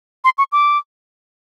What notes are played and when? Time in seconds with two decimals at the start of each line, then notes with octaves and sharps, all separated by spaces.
0.24 C6
0.38 C#6
0.52 D6